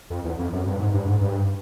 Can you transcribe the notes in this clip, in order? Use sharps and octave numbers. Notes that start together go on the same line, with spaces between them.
F2
E2
F2
F#2
G2
G#2
G2
G#2
G2